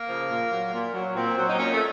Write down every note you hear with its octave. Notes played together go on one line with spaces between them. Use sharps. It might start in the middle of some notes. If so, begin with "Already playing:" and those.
Already playing: A#3
C#3 F3
A#2
F#3
A#2
F#3
A#2 C4
F#3
D#4
A#2 C#4
A3